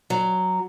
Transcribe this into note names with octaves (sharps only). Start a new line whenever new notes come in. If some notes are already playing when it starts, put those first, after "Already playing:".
F#3